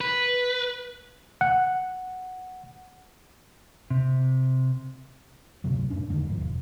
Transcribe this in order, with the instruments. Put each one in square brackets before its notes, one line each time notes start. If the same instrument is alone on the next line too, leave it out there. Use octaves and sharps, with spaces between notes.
[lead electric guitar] B4
[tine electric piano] F#5
[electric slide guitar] C3
[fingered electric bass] D2 G2 C3 F#3
F#2 A2 C#4 D4
E2 G2 D3 D#3
D#1 G#2 F3
E1